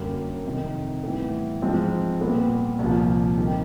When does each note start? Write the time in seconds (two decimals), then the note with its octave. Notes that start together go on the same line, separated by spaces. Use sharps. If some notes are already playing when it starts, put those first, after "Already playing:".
Already playing: F#2 D3 G3 A#3 C#4
0.44 F2 C3 D#3
1.04 A2 E3 G3 B3
1.62 G#2 F3 G#3 C4
2.21 A#2 G3 B3
2.79 C2 A#2 F3
3.37 D#3 G3 C4